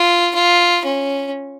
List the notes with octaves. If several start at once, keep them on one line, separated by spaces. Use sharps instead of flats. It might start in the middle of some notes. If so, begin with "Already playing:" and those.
Already playing: F4
F4
C#4